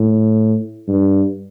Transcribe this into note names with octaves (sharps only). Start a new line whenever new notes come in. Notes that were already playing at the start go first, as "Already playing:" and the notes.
Already playing: A2
G2